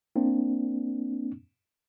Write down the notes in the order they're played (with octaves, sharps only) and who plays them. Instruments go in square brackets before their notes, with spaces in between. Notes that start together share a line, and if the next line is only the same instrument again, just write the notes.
[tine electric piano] A#3 C4 D4